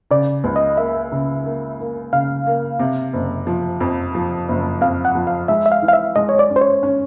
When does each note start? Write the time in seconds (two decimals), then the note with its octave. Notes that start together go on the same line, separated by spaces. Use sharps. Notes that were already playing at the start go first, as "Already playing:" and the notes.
0.11 C#3 D5
0.44 C#2
0.56 D#5
0.77 A#3 E5
1.12 C#3
1.45 A#3
1.80 A#3
2.13 C#3 F5
2.47 A#3
2.80 C3
3.13 F#1
3.47 F3
3.81 F2
4.15 F3
4.49 F#1
4.81 F2 F5
5.05 F#5
5.15 F3
5.27 F5
5.48 G#3 E5
5.66 E5
5.72 F5
5.82 E3
5.88 F5
5.93 E5
6.16 G#3 D#5
6.29 C#5
6.39 D5
6.50 C#4
6.56 C5
6.61 C#5
6.83 C#4